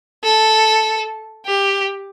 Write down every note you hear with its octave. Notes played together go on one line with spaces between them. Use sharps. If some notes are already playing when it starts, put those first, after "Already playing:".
A4
G4